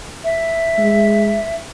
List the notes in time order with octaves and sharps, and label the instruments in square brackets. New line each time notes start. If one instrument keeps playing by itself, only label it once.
[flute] E5
[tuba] G#3